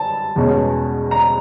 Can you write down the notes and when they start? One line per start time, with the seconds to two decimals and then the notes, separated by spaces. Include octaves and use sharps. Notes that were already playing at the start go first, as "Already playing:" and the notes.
Already playing: A5
0.36 E2 B2 G#3 C#4
1.11 A#5